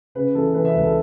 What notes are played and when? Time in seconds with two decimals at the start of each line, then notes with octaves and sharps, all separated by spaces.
0.15 C#3 B4
0.35 E3 A4
0.54 E3 B4
0.65 E5
0.74 C#2 B4
0.84 A4